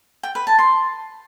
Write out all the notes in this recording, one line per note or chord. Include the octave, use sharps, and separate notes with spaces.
G5
B4
A5
C6